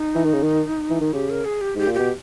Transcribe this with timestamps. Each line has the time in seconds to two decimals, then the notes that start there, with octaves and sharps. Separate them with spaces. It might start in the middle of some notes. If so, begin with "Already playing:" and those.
Already playing: D#4
0.15 E3
0.25 D#3
0.34 C#3
0.43 D#3
0.90 E3
1.01 D#3
1.13 C#3 G4
1.30 A#4
1.45 G#4
1.61 G4
1.75 G#2 G4
1.87 A#2
1.94 G4
1.99 B2